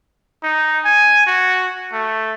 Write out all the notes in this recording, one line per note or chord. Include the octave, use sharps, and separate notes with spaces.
D#4
G#5
F#4
A3